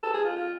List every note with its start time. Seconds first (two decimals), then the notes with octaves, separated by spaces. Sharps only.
0.03 A4
0.14 G#4
0.25 F4
0.36 F4